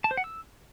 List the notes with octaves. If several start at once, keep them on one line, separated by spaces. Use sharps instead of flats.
A5
C5
F#5
E6